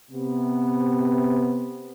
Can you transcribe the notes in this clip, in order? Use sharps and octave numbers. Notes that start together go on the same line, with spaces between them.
C3 B3